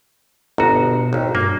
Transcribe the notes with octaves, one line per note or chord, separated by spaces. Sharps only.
G1 B2 F#4 A#5
G#1 D#2
G2 A#3